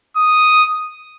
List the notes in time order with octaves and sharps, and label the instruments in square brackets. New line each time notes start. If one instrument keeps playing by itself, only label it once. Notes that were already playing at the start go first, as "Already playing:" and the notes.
[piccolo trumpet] D#6